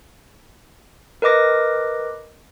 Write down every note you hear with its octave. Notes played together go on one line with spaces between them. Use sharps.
A#4 B4 D#5 D6 A#6